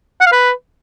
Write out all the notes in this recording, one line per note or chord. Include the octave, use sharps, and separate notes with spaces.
F#5
F5
B4